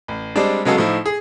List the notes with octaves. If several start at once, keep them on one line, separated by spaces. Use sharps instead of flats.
A1
G3 G#3 C4 D4
C#3 F#3 G#3 B3 F#4 A4
A2 F3 D#4 E4
G#4